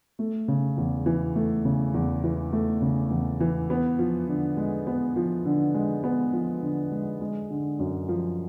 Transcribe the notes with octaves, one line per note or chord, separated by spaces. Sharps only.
A3
C#3
E2
E3
A3
C#3
E2
E3
A3
C#3
E2
E3
B3
F3
D3
G#3
B3
F3
D3
G#3
B3
F3
D3
G#3
G#3
D3
F#2
F3